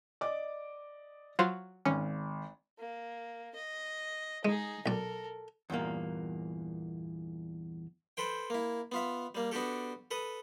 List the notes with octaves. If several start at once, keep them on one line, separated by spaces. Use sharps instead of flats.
D5 D#5 D6
F#3 F4 C5
G#1 C#4
A#3
D#5
G#3 D#4 G#4
B1 A4 A#4 D5
E2 G2 A#2 A#3
A4 B4 C5 G5
A#3 E4
B3 F4 E5
G3 A#3
B3 D4 F#4 G4 A4
A4 B4 D#6